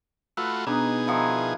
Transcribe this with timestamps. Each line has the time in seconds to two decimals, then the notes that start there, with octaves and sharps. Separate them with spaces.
0.37 A3 F4 F#4 B4 E6
0.67 B2 B3 D4 D#4 G#4
1.07 D#3 F3 E4